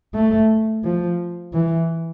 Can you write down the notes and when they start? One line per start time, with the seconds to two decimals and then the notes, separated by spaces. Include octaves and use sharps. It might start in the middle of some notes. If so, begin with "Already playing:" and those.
0.14 A3
0.84 F3
1.53 E3